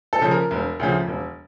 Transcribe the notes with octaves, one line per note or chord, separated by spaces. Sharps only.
A4
C#3 F3
A#4
E1
D2 C#3 F3
E1